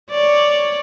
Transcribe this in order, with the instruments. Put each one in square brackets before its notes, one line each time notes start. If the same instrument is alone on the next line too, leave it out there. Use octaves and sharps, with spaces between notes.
[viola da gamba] C#5 D5